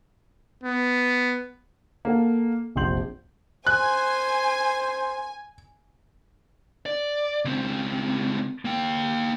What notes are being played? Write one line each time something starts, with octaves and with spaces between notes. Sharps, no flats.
B3
A#3 A4 F#5
F1 A#1 C4 C6 G6 F#7
C5 G#5 F#6
D5
C#2 C4
A#3 G5